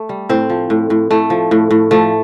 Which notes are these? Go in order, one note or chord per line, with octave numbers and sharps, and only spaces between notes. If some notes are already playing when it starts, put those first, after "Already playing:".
Already playing: A3
G3
A2 C4
F3
A2
A2
A2 A3
F3
A2
A2
F3 A3